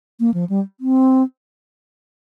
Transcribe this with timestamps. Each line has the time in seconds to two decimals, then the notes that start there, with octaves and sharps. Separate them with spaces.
0.20 A#3
0.34 F3
0.49 G3
0.80 C4